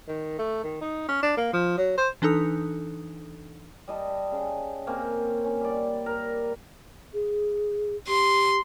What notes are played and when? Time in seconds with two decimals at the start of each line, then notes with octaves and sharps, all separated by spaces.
0.08 D#3
0.38 A3
0.64 D#3
0.81 D#4
1.09 C#4
1.22 D4
1.37 A#3
1.53 F3
1.78 F#3
1.97 C5
2.22 E3 D4 D#4 A4 D#6
3.88 G3 D#5 A5
4.32 C#3
4.87 A#3 C4 C#4
5.44 C#4
5.61 G3 D5
6.06 A#4
7.13 G#4
8.08 G4 C6